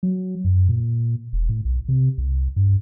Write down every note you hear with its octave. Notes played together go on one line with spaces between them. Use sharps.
F#3
F#2
A#2
E1
A2
B1
C3
C2
G2